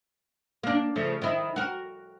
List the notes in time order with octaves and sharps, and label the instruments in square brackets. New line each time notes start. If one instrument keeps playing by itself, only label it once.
[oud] A#3 D4
C#3 F3 A3
D#3 E4
F#4 A#4